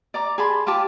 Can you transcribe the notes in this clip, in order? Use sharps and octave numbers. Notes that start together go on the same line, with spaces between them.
D5 A#5 D6
G#4 A5 B5 C6
F4 G4 A5 D6